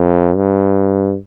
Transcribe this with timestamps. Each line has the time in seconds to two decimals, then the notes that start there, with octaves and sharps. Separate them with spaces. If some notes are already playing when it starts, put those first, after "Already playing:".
Already playing: F2
0.36 G2